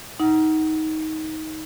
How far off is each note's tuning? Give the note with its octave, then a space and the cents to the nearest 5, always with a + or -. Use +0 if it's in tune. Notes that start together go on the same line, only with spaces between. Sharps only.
D#4 +15 F#5 +20